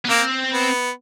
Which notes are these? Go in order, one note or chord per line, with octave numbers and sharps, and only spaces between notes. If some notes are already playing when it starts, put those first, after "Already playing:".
B3
A#3 C4
B3